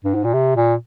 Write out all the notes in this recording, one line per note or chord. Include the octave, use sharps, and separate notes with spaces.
G2
G#2
A#2
C3
A#2